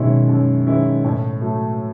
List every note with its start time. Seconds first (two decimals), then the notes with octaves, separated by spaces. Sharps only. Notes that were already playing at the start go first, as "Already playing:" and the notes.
Already playing: F#2 B2 D#3 G#3 C#4 E4
0.29 F#2
0.67 D#3 G#3 C#4 E4
1.05 A2
1.41 F#3 A3